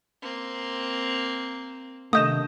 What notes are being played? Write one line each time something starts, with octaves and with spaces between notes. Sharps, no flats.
A#3 C4
C3 D#3 A3 D4 D#5 D#6 G6 E7